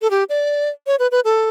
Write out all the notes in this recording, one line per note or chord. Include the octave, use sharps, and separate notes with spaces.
A4
G4
D5
C#5
B4
B4
A4